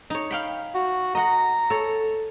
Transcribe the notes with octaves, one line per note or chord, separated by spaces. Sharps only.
D#4 C#5
F5 G5 B5
F#4
D#5 F#5 A#5
A4 C#5